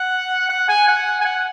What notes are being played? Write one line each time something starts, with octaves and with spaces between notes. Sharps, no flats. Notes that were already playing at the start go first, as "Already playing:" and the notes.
Already playing: F#5
F#5
G#5
F#5
G#5
F#5